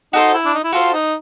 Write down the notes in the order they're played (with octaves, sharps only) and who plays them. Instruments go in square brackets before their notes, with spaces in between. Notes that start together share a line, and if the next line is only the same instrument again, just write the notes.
[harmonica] D#4 [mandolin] F#4 A4 C5
[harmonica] E4
D4
D#4
E4
[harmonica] F4 [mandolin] F#4 A4 C5
[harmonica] D#4